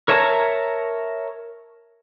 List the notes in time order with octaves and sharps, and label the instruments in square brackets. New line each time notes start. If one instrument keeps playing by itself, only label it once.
[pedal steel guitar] A#4 C#5 E5 A5 A#5